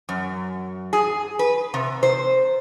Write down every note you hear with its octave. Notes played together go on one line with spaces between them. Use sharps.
F#2
G#4
B4
C3
C5